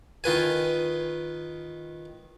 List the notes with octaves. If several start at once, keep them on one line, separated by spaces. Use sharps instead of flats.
D#3 F4 B4 G#5